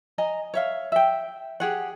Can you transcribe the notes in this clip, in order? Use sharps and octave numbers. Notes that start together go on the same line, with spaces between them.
D#5 G#5 A#5
C#5 E5 F5
E5 G5
G4 G#4 F#5